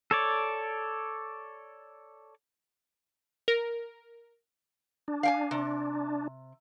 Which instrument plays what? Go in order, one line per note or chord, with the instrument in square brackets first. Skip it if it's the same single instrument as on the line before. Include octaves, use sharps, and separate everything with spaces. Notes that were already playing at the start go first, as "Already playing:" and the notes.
[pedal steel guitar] A4 C#5 D5
[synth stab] A#4
[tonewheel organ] D4
[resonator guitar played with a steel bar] F5 G5 G#5
C3